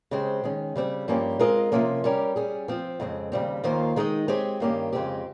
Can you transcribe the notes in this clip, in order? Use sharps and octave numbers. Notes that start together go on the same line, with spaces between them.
C#3 G#3 C4 G4 C5
D#3 G#3 C#4
C#3 G3 C4
G2 F3 A#3 C#4 G4
G#3 C4 F4 A#4 D#5
C3 F3 A#3 C#4
G3 C#4 G4 A#4
G3 C#4 G#4
F3 C4 F4
F2 C#3 G#3 C4
D#2 C#3 G3 C4
D#2 D#3 A#3 F4 C5
D#3 G#3 D#4 A#4 D#5
G#3 C4 G4 C#5
G2 D#3 A#3 C#4 G4
F2 C#3 G#3 C4 G4